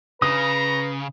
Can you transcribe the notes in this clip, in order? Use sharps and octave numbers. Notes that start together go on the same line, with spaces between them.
C#3 B4 A#5 D#6